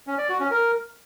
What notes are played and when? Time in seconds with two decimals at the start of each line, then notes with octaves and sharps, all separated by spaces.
0.07 C#4
0.18 D5
0.29 F#4
0.40 C#4
0.51 A#4